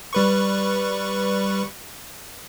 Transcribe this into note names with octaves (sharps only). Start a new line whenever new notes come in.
G3 B4 C#6